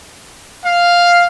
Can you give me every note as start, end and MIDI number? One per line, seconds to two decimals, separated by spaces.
0.64 1.27 77